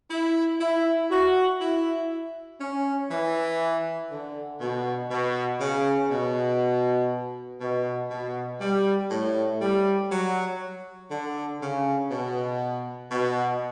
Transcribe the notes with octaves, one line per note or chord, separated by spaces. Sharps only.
E4
E4
F#4
E4
C#4
E3
D3
B2
B2
C#3
B2
B2
B2
G3
A2
G3
F#3
D3
C#3
B2
B2